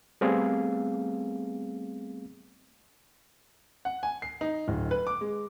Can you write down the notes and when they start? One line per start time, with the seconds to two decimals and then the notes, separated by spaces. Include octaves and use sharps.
0.21 G3 A3 B3 C4 G#4 F5
3.85 F#5
4.03 G#5
4.22 C7
4.41 D#4
4.68 D1
4.91 B4
5.07 D6
5.21 G#3